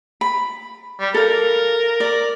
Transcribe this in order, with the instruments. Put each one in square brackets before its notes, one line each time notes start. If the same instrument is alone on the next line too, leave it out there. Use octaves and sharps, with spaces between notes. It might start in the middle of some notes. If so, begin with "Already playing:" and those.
[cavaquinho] B5
[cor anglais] G3
[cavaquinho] A4 F5 [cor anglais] A#4
[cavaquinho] D5